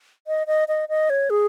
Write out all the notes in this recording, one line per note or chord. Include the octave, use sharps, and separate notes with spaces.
D#5
D#5
D#5
D#5
C#5
G#4